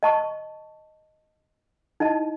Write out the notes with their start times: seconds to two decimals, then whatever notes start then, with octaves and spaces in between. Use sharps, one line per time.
0.03 D#5 A5 C#6
2.00 D#4 E4 D#5 A5